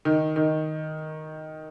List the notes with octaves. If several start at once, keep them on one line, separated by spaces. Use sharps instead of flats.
D#3
D#3